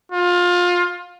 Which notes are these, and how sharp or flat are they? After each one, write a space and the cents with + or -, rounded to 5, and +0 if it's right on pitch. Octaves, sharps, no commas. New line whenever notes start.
F4 +25